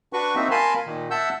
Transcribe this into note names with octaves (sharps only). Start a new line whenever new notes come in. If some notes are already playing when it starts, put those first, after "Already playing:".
D4 F#4 B4 C#6
A#3 C4 D#4 F#4 E5
A#4 F5 G#5 A5 B5 C6
A#2 D#3
E5 F#5 A5 E6 G6